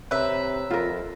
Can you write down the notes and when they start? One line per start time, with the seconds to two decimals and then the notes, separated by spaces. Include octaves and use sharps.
0.11 C3 B4 C#5 E5 A#5
0.71 F2 F4 A#4